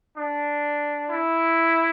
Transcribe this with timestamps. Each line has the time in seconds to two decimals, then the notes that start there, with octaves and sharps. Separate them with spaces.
0.16 D4
1.10 E4